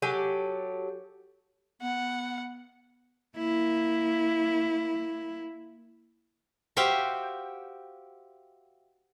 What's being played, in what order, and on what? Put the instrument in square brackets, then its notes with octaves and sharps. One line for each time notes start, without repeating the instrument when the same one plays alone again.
[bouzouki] F#3 G4 A4 G#5
[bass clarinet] B3 [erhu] F#5
[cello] A#3 E4
[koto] F#4 G4 C5 E5 F5 G5